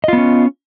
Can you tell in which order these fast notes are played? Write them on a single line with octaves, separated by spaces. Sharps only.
D#5 F4 B3 C#4